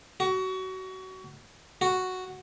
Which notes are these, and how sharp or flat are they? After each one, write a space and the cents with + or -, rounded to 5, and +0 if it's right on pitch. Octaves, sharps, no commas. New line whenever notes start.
F#4 +25
F#4 +0